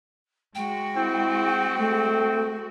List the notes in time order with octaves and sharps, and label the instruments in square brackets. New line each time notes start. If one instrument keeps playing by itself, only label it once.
[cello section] G#3 F#4 [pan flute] G5
[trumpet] C4 [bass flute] E4
[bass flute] A3 [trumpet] C4